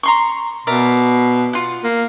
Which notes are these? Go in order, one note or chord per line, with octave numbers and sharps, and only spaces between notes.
A#5 C6 C#6
B2 A#4 D5 E5
F4 F#5
A#3